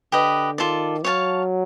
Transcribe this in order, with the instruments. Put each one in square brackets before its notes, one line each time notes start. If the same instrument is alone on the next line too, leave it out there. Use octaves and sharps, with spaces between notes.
[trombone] D3 [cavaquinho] G4 B4 D#5
[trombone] D#3 [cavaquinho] F4 A4 D5
[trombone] F#3 [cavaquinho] C#5 F5 A5